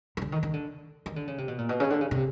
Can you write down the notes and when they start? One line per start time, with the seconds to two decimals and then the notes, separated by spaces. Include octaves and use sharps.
0.17 D#3
0.22 D3
0.32 D#3
0.43 D#3
0.53 D3
1.06 D#3
1.16 D3
1.27 C#3
1.38 C3
1.48 B2
1.58 A#2
1.69 B2
1.80 C#3
1.90 D3
2.01 C#3
2.11 C3